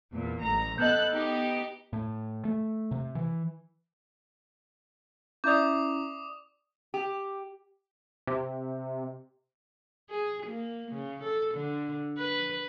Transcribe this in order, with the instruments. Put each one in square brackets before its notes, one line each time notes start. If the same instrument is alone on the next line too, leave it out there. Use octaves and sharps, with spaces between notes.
[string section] E2 A#2
A1 A#5
[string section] B3 A4 F#6 [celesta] D#5 G6
[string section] B3 D#4 G4
[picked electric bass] A2
A3
C3
E3
[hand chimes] C#4 E4 A#5 [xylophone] D5 E5 G6 [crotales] D6 D#6
[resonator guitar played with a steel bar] G4
[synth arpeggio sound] C3
[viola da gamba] G#4
A#3
C#3
A4
D3
B4